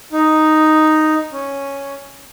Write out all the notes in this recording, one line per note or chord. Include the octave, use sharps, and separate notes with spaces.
D#4
C#4